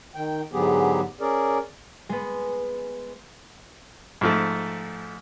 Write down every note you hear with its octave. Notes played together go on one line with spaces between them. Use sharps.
D#3 G5
G#2 D3 F#3 B3 G4 G#4
C#4 G#4 A#4 D5
G#3 B3
G#2 F3 A3